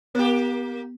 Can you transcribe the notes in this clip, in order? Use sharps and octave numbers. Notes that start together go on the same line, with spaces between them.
A#3 B3 G4